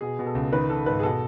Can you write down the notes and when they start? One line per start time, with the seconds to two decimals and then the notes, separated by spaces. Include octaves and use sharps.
0.01 B2 G#4
0.19 B2
0.26 A4
0.35 C#2
0.52 D#3 B4
0.69 D#3 A4
0.86 G#2 B4
0.99 G#4
1.03 B2 A4